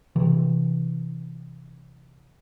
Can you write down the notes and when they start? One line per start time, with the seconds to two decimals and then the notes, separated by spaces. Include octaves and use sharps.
0.16 C3 E3